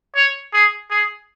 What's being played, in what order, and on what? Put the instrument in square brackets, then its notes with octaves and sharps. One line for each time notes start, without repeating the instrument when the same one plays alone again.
[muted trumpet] C#5
G#4
G#4